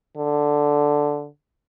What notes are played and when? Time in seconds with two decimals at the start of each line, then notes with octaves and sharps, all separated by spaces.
0.17 D3